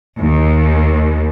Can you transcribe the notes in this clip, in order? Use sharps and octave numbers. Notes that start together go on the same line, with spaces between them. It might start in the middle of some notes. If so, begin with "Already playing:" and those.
D#2